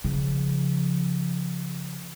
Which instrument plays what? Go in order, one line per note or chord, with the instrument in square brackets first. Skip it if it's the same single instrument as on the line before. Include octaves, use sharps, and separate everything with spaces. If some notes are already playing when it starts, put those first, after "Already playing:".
[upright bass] C#3 F3